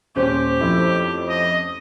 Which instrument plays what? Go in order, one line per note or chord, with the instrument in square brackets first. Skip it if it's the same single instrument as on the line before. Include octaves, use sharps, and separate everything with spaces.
[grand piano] D#1 [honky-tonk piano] C#4 C5 [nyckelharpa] G4
[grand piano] F2 A3 E4
[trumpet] D#5